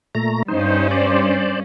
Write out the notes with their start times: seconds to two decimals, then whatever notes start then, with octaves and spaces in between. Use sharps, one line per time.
0.15 A#2 A3 A#5
0.48 G2 C#4 D#4 C5
0.91 C5 D5